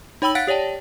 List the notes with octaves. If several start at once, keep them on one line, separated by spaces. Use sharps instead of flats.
D#4 C#5 G5 B5 E6 F#7
F5 F#5 F#6 A6 B6
G4 C#5 D5 G5 A5